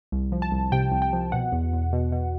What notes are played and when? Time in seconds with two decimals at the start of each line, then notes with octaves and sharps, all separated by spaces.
0.12 C2
0.32 F3
0.42 A5
0.52 C2
0.72 C3 G5
0.92 C2
1.02 G5
1.13 F3
1.32 B2 F#5
1.53 E2
1.73 E2
1.93 B2
2.12 B2